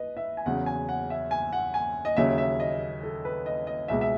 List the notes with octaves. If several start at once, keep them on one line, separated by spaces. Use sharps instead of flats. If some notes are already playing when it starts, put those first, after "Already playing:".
Already playing: B4 D#5
E5
G#5
E2 C#3 F#3 F#5
G#5
F#5
E5
G#5
F#5
G#5
D#5
D#2 C#3 F#3 E5
E5
D#5
A4
B4
D#5
D#5
C#2 B2 G#3 E5
E5